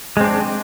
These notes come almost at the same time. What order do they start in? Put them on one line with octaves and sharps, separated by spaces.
G#3 C4 D4